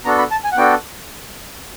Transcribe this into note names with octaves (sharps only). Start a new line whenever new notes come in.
B3 D4 F#4 A4 A#5
B5
A5
G#5
F#5
B3 D4 F#4 A4 G5